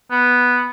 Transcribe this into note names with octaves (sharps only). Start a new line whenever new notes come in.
B3